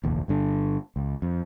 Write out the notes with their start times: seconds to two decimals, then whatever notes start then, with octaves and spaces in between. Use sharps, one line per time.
0.04 F1 A#1 D#2
0.28 G1 G2 D3
0.96 C#2
1.22 F2